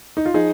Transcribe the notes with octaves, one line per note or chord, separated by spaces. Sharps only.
D#4
F4
F3 D#4 G#4